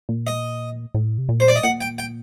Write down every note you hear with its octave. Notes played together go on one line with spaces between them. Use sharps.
A#2
D#5
A2
C3
A#2
C5
D5
D#5
A#2 F#5
G5
G5